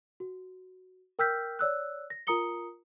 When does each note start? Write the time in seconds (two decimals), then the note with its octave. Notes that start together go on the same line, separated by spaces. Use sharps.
0.20 F#4
1.19 A#4 G5 E6 F6 G6 B6
1.59 C#5 D5 E6 F#6
2.10 A#6
2.27 F4 A#4 A#5 D#6 C#7 G7